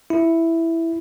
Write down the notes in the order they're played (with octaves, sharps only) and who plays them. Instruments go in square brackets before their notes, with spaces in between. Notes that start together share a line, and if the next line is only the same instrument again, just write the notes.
[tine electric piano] E4